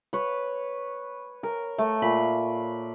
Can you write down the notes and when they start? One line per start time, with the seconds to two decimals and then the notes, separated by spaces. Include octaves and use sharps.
0.13 B4 C#5
1.43 A#4
1.78 A3
2.02 A#2 B5